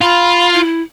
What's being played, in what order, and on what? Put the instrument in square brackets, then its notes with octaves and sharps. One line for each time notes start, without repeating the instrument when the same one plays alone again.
[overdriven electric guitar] F4 [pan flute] B5
[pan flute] E4